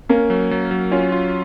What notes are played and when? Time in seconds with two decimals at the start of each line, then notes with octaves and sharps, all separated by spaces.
0.09 A#3 C#4
0.30 F#3
0.51 F#3
0.71 F#3
0.91 C#4 F4
1.12 F4